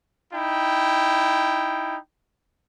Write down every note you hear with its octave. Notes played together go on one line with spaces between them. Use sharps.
D#4 E4 G5